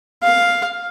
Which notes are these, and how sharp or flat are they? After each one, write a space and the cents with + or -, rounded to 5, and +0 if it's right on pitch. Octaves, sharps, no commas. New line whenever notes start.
F5 +5